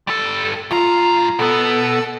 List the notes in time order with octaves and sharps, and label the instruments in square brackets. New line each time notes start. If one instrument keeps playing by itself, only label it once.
[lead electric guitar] G3 A4
[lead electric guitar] G2 A#5 [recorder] F4
[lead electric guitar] B2 B3 [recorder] A4